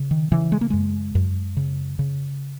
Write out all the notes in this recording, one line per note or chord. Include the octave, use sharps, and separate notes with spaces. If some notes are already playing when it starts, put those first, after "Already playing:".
Already playing: C#3
D#3
C#3 E3
G#3
A#3
F#2 G#3
F#2
C#3
C#3